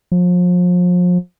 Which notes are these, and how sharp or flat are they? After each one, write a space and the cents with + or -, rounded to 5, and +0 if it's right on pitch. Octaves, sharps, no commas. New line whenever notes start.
F3 +35